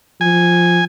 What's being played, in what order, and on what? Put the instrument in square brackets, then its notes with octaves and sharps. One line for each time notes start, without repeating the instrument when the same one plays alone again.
[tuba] F3 [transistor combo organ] G#5